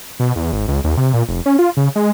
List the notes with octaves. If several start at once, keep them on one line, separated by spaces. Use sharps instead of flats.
B2
E2
G#1
C#2
D#2
C3
A#2
F1
C#4
F4
C#3
G#3